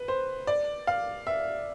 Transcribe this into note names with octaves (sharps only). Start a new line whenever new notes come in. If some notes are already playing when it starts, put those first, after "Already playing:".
Already playing: B4
C5
D5
F5
E5